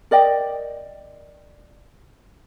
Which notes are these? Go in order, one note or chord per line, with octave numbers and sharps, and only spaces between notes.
A#4 D5 D#5 G5